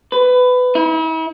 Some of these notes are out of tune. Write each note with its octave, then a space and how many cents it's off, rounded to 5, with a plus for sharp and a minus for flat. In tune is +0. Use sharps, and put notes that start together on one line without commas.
B4 +20
E4 -40